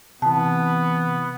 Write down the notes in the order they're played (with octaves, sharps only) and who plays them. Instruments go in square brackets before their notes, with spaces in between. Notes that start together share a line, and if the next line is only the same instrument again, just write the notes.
[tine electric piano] C3 E3 [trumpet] B3 [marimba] A5